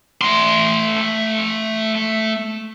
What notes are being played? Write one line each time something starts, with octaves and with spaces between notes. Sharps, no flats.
A3 C6